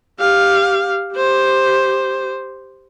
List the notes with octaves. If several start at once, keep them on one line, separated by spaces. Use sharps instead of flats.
G4 F5
G4 C5